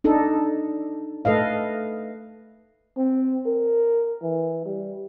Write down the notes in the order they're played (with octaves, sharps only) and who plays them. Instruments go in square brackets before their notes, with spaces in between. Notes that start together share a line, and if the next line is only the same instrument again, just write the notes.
[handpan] D4 D#4 A4
A3 A4 B4 D#5 F5
[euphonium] C4
A#4
E3
G3